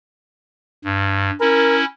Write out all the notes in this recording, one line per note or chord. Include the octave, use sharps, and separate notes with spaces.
G2
C#4 E4 A#4